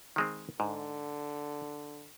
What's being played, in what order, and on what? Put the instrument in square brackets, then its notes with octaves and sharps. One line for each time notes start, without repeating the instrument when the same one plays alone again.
[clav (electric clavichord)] D#3 G#3 C4
[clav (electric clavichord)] G#2 [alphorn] D3